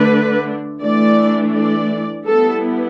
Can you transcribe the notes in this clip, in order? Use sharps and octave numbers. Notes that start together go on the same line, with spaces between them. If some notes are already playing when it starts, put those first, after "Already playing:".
Already playing: D3 A3 D4 B4
E3 A3 D4 D5
D5
G3 B3 E4 A4